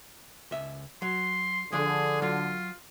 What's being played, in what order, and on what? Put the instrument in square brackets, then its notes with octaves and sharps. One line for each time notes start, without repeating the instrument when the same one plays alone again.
[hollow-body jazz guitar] C#2 E5
[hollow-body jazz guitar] F#3 [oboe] C6
[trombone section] D3 [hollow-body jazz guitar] F3 D4 [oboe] G#4
[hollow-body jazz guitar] F#3 [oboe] F4